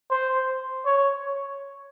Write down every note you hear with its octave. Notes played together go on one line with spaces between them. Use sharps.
C5
C#5